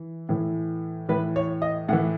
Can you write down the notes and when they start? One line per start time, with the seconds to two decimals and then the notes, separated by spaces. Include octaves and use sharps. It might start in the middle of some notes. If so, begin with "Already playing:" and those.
Already playing: E3
0.29 A2 E3
1.09 A2 E3 B4
1.36 C#5
1.62 D#5
1.89 A2 F#5
1.93 E3